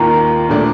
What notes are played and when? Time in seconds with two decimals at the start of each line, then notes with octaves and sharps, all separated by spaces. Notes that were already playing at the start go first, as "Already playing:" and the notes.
Already playing: D#2 D#3 A#3 F4 A#5
0.49 A#2 F3 A3 D4